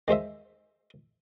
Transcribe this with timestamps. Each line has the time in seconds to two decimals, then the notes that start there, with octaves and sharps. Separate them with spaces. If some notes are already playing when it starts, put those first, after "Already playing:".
0.08 D#3 G#3 C5 E5